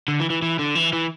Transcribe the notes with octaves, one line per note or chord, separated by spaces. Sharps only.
D3
E3
E3
E3
D3
E3
E3